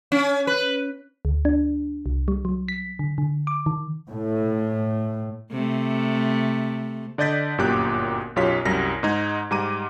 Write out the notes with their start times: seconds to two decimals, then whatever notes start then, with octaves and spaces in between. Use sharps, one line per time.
0.12 C#4
0.47 B4
1.25 D2
1.45 D4
2.06 C2
2.28 G3
2.45 F#3
2.68 B6
2.99 D3
3.18 D3
3.47 D6
3.66 D#3
4.09 A2
5.52 C3 A3
7.18 D3 D5 D#5 G6 A6 B6
7.58 G1 F#2 A#2 G4 D6 F#6
8.36 B1 F#2 F4 G4 C#5 B6
8.65 C2 F#2 G3 A#6
9.03 G#2 G#3 D#4 G#6
9.51 G#2 G3 A#5 D6 D#7